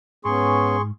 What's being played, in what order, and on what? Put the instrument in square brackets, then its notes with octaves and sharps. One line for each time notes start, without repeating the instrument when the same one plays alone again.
[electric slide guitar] G#2 [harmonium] B3 C#4 [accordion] G#4 C6 C#6